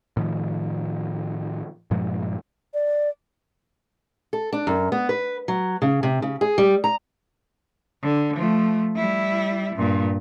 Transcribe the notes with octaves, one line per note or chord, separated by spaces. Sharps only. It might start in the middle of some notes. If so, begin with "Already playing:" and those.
A2 D#3 F3
G2 A#2 F3 G#3
D5
A4
D4
F#2
B3
B4
F#3
C#3
C3
C#3
G#4
G3
A#5
D3
F3 A3
G3 E4
G2 A#2